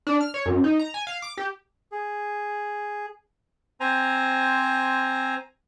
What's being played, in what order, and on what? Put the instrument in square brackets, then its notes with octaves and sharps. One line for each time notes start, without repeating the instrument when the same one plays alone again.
[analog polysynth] D4
F6
C#5
F#2
D#4
A#5
G#5
F5
D6
G4
[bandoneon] G#4
[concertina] C4 C5 G#5 A#5